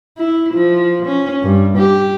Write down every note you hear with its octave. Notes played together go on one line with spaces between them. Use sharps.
E4
F3
C#4
G2
G4